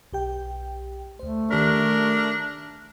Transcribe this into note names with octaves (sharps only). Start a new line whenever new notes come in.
B1 G4 G5
D2 A3 C5
D#3 D4 G4 A#4 B6